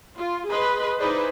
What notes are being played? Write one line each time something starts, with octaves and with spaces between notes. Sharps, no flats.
F4
G#4 B4 D#5 B5 C6
D#4 E4 G#4 B4 C5 D5